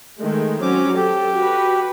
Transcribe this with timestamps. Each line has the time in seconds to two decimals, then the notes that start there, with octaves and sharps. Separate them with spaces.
0.19 D#3 G#3 A3
0.62 F#3 C4 C#4 D6
0.96 G4 A4
1.35 F#4 B4